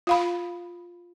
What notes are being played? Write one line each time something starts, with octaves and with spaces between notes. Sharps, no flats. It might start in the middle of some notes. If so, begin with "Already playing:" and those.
F4 F5 B5